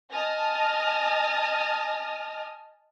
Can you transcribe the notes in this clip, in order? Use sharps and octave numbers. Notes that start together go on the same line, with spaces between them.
D#5 G#5 A5 D#6 F6 A#6